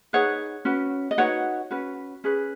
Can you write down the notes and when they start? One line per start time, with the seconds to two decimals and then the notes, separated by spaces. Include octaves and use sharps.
0.13 D#4 G#4 B4 C#5 F#5
0.65 C#4 F#4 B4
1.11 D#5
1.18 D#4 F#4 B4 C#5 F#5
1.71 C#4 F#4 B4
2.24 C#4 G#4 B4